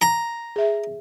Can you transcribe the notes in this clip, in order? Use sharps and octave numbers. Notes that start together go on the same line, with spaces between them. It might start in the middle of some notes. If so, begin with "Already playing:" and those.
A#5
G#4 E5